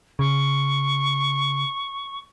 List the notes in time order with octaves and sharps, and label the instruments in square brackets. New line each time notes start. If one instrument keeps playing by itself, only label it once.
[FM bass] C#3 [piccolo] C#6